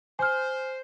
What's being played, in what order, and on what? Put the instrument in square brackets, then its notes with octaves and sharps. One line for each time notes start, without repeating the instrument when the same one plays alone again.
[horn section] C5 [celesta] G#5 F6